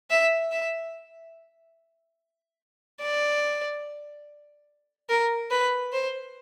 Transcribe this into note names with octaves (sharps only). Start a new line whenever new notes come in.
E5
E5
D5
A#4
B4
C5